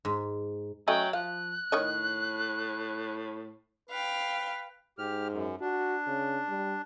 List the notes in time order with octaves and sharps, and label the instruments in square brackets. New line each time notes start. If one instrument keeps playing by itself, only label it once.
[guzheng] G#2
[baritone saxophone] F#3 [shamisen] A3 C#4 D#5 [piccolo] G5
[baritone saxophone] F3 [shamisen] F5 [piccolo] F#6
[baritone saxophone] A2 [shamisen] D#3 C#5 D#5
[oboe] B4 [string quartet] F5 G5
[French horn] G#2 [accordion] G4 F6
[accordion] F#2
[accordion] D4 [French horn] F#4
[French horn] C#3
G3